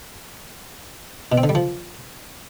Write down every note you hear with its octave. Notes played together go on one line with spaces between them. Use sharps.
B2
C4
D3
G3
F3